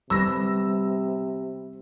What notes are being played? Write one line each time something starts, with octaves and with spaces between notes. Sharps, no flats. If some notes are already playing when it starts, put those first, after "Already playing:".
C3 G3 B3 E6 A#6